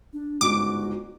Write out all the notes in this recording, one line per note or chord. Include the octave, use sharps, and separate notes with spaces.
D4
G1 C#2 G#2 F#4 D6